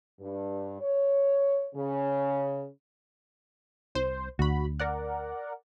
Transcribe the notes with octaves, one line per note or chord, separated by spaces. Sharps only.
G2
C#5
C#3
C2 C5
D2 F#4 B5
A#4 D5 F#5